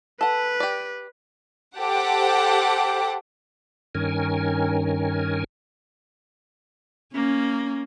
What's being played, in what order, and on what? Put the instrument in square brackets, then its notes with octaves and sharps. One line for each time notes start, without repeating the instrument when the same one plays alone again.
[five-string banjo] A4 F#5 [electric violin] B4
[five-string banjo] G4 D5
[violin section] G4 A4 C5 F#5 G5 D6
[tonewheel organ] G2 D#3 C#4 A#4 G#5
[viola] A#3 [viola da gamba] C#4